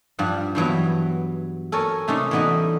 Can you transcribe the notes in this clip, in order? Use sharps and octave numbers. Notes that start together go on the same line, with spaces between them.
G2 F3 F#5
G2 E3 F#3 B3
A4 A#4 C#5 G#5
C3 A3 C#4 D#4 A4 C6
E3 G3 B3 D#4 F#4 D#5